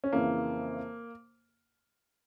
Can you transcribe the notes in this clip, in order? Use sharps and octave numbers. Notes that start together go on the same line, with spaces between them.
C#4
F2 C#3 E3 A#3